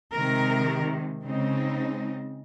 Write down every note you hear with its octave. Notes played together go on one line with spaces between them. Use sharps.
C3 D#3 G#3 A#4
C#3 G#3 C4 D#4